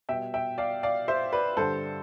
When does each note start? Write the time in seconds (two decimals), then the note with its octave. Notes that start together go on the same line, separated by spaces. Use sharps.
0.09 B2 G3 E5 G5
0.34 E5 G5
0.58 D5 F5
0.83 D5 F5
1.08 C5 E5
1.33 B4 D5
1.57 G2 D3 G3 A4 C5